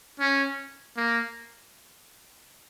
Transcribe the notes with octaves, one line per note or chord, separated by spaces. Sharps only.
C#4
A#3